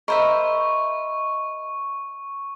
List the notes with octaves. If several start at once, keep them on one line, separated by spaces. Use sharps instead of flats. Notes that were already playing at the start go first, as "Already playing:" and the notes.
A#4 C5 D#5 E5 B5 C#6